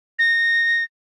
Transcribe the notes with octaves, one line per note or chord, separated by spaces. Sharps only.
A#6